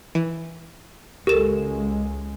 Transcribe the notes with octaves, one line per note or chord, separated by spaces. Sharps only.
E3
C#2 G#3 G4 A4 A#4 E7